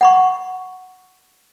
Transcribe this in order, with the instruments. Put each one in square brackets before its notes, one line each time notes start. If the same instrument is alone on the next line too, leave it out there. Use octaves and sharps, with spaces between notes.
[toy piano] F#5 B5 C#6